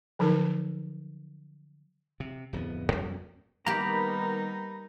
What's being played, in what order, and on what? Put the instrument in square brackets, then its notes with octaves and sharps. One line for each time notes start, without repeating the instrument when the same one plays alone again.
[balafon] D3 F3 F#3 D#4 A#4
[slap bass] C3
D1 F2 E3 B3
F2 G3 A#3 C#4
[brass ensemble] D#3 B3 [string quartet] G3 D#4 [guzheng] A#3 G4 [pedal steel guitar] A#5 B5